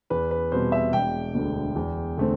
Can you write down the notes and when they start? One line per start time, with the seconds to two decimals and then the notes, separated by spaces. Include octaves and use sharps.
0.10 E2 B4
0.31 B4
0.52 B2 G3 C4 C5
0.72 E5
0.93 E1 G5
1.35 D2 D3
1.76 E2
2.17 D3 A3 C4